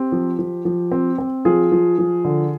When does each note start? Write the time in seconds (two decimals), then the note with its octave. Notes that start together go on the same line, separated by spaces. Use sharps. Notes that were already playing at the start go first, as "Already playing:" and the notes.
Already playing: C4 G4
0.12 F3
0.39 F3
0.65 F3
0.91 C4
1.18 C4
1.45 F3 F4 G#4
1.72 F3
1.98 F3
2.25 D3